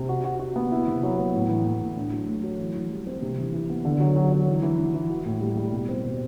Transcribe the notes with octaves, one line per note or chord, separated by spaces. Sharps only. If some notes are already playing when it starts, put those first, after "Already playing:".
Already playing: C3
F#4
F#4
F#4
B3
E4
C3
F#3
B3
A2
E3
A2
A2
D4
F#3
A3
F#3
E3
E3
G3
C4
C3
E3
E3
B3
D3
F#3
F#3
F#3
E3
E3
E3
E3
F#4
A2
G3
G3
B2
C4
B2